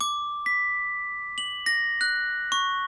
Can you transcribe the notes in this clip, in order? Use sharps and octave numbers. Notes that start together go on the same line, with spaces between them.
D6
B6
F#7
A#6
F#6
C#6